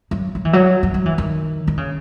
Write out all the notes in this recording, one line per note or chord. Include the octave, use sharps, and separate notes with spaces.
F#3
F#3
E3
F#3
F#3
F#3
E3
D#3
D#3
C#3